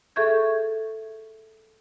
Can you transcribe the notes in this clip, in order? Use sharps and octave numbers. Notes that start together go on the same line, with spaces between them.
G#4 A4 E5 C#6 G6 G#6